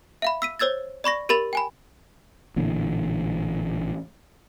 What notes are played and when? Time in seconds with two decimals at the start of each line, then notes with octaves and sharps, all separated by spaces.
0.22 E5 F5 B5
0.42 E6 B6 D#7
0.59 C5 C#5 E6 G#6 A6
1.04 D5 B5 C#6 A#6
1.29 G4 A#4 B5 A6 F7
1.53 G5 G#5 B5
2.56 A1 A#2 D3 E3